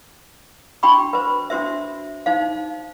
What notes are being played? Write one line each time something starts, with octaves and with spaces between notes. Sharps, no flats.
D4 F#4 G5 B5 C#6
B4 C5
D4 F#4 C5 E5
D#4 C5 F5